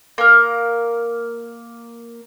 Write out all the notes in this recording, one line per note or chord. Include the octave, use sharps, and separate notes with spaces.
A#3 A#4